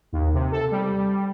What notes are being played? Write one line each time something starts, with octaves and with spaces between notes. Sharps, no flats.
D#2
C3
A4
G3